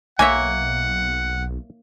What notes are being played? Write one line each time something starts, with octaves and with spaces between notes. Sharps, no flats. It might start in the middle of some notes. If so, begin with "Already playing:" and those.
B1 A#3 C#5 E5 F#5 G#5